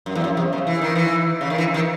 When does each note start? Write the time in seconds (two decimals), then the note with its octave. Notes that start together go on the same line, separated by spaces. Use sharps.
0.06 F#2
0.15 E2
0.24 F#2
0.37 C3
0.53 C#3
0.67 E3
0.81 D#3
0.95 E3
1.41 C#3
1.50 D#3
1.58 E3
1.74 D#3